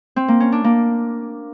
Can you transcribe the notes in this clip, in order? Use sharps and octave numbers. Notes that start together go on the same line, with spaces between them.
C4
A#3
C#4
D4
A#3